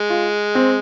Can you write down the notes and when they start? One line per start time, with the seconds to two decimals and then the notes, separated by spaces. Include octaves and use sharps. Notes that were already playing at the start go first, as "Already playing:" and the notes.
Already playing: G#3
0.10 F4
0.55 C4